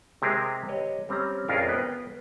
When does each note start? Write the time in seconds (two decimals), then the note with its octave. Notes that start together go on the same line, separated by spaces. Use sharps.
0.22 C3 G#3 C4 G4 G#4 A#4
0.68 G4 B4 C#5 D#5
1.09 G3 C4 C#4 A#5
1.48 A#1 F2 C#4 F4 G#4 A#4
1.68 B3 B4 G5